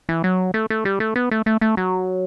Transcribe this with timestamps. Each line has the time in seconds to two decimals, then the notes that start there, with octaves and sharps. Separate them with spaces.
0.09 E3
0.24 F#3
0.54 A3
0.70 A3
0.85 G3
1.00 A3
1.16 B3
1.31 A3
1.46 A3
1.61 A3
1.77 F#3